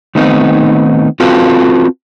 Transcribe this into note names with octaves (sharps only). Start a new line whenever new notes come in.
D#3 A3 B3 C4 D#4
C4 F4 F#4 A4 B4 F5